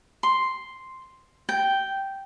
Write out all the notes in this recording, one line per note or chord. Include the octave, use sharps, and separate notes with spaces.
C6
G5